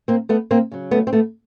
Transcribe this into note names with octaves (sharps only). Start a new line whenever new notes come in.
A#3 C4
A3 B3
A#3 C4
C#3 F#3
A3 B3
C4
A3 B3